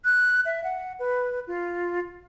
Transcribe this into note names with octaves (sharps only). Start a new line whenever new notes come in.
F#6
E5
F#5
B4
F4